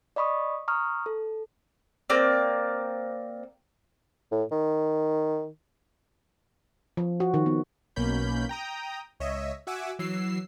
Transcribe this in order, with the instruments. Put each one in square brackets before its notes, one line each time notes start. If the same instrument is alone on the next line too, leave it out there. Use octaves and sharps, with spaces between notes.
[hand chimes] D5 D#5 B5 C#6 D#6
A#5 C#6 D#6 F6
A4
[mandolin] A#3 C4 D5
[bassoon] A2
D#3
[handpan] F3
F#4
D#3
B3
[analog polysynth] B1 B2 A#3 C#4 B5 G6
G5 A#5 D#6
C#2 C#5 D#5 E5
F#4 E5 F#5 G#5 D6 E6
E3 F#3 E6 C7